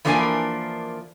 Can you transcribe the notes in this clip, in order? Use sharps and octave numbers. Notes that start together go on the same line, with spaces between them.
E3 F3 A#3 D4 A#4 G#5